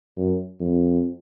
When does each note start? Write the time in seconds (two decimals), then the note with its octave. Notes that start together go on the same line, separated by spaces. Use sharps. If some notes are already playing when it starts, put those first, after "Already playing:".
0.17 F#2
0.60 F2